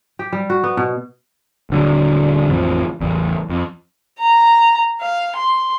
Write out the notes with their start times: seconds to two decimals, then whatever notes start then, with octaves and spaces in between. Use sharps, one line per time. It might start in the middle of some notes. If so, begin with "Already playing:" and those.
0.19 G4
0.33 G3
0.50 F#4
0.64 B3
0.77 B2
1.70 D#1 D3 F#3
2.48 A1 F2 F3
3.01 A1 E2
3.50 F2
4.19 A#5
5.01 F5
5.36 C6